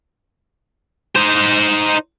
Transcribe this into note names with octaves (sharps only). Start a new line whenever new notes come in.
D#4 C5